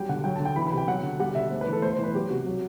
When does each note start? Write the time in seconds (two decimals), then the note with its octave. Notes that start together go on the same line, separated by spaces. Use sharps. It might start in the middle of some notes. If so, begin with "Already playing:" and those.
Already playing: F#3 G3 G5
0.09 D3 F#5
0.24 F#3 G5
0.36 D3 A5
0.45 G5
0.56 E3 B5
0.67 B5
0.72 C3
0.77 G5
0.87 F#3 F#5
1.03 D3
1.20 G3 F#5
1.35 D3 E5
1.51 A3 C5
1.61 B4
1.67 E3
1.73 A4
1.82 A3 C5
1.93 C5
1.99 E3 B4
2.14 F#3 G4
2.30 C3 F#4
2.46 F#3